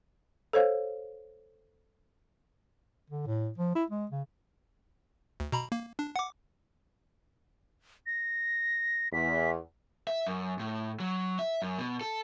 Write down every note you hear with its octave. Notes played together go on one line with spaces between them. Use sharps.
A4 C5 C#5 F5
D3
A2
F3
E4
G#3
C#3
D2
B2 A#5 B5
A#3
D4
F#5 D6
A#6
E2 B6
E5
F#2
A2
F#3
E5
F#2
B2
A4